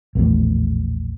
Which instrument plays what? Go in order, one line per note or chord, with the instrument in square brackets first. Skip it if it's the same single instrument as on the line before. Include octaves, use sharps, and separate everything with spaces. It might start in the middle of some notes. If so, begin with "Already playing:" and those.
[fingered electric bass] A#1 E2 A2